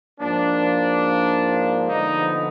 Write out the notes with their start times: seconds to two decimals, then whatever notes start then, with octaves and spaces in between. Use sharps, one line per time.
0.20 G#2 F3 A#3 D4
1.88 D3 F3 G#3 B3 D#4